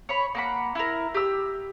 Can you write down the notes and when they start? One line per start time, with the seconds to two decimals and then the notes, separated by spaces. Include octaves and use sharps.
0.09 C#5 B5
0.35 A#3 F#5 B5
0.75 E4 A#4
1.15 G4 E6